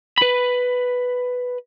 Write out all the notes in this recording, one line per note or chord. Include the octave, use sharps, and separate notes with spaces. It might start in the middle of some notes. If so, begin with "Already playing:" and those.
B4 B5